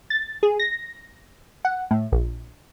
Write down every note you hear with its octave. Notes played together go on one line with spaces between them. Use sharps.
A6
G#4
A#6
F#5
A2
A#1